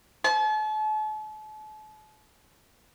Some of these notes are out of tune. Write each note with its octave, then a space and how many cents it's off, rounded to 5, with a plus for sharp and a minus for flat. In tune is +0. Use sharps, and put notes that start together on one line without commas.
A5 -40